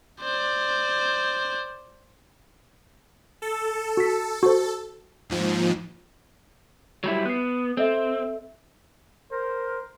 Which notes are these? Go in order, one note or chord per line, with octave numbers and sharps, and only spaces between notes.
C5 D5
A4
F#4 B6
F#4 C5
D#2 G#2 F3
F#3 G3 E4
B3 F#6 C7
C4 A4 D#5 E5
A#4 C5